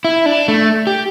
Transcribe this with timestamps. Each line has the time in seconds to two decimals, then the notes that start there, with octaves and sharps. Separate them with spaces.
0.05 E4
0.26 D4
0.48 A3
0.87 G4